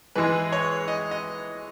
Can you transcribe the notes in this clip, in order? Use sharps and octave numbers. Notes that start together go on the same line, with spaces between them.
G#2 E3 G#3 B4
C#5
D#5
D#5